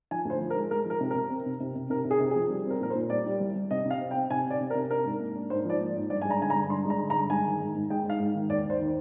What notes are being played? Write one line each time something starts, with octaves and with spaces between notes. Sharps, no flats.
F3 G#5
D2 C5
F3
A#4
G#3
G#3 A#4
F3 A#4
C3
C3 A#4
C4
C3
C3
C3
C3 A#4
C3
G#4
C3
G#4
F3
G3
C4
A#4
A#2 A#4
C5
A#2
G3 D5
G3
C2
C2
C3 D#5
C3
F5
C4
G5
C4
C3 G#5
C4 D5
C3
A#4
C3
D4 A#4
G#2
A#3
D4
G#2 C5
F3 D5
A#3
G#2
G2 D5
G#3 G#5
A#5
D3 G#5
A#5
G2
D4 C6
G#3 A#5
D3
A#5
G2
G#3 G#5
D#3
G#2
G#2
G#3 G5
G#2 F5
G#2
D#3
D#2 D5
D#2 C5
D#3